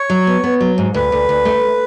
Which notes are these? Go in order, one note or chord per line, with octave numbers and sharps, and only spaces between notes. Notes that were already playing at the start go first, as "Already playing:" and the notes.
Already playing: C#5
F#3
B3
B3
F#3
G#2
D2 B4
D2
D2
A3